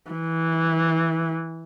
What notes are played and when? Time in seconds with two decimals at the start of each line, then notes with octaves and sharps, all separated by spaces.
0.11 E3